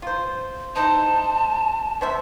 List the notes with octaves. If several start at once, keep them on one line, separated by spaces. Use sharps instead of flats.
F4 C5
D#4 E4 C5 A5
B3 C5 E5